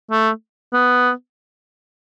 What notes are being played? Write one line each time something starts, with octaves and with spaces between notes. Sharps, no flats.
A3
B3